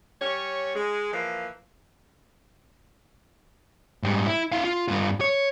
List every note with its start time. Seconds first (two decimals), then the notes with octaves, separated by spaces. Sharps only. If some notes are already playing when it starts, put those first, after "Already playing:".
0.20 G3 C#4 C#5
0.75 G#3
1.12 E3 F3 A#3
4.03 G#2 G3
4.26 E4
4.52 E4 F5
4.64 F4
4.88 G2 F4
5.21 C#5